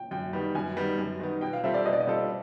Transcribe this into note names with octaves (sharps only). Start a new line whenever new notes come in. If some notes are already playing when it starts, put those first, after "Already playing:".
Already playing: G5
F#2 G5
D#3 G3 B3
F#2 G#5
D#3 G3 B3
F#2
D#3 G3 B3
B2 G5
F5
G3 C4 F4 A4 E5
D5
B2 D#5
D5
D#5
G3 C4 F4 A4